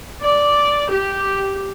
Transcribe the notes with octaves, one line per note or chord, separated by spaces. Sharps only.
D5
G4